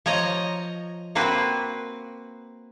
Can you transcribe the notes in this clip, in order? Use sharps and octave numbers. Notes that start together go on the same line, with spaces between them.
F3 C#5 D#5 A#5
A#3 C4 F#4 B4